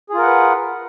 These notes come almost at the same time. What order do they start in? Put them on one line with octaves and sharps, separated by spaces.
G#4 F4 A#4 F#5 B4